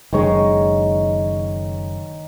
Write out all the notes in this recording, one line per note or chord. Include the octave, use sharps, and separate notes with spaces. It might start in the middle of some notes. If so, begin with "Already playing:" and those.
F#1 D#3 G#3 C#5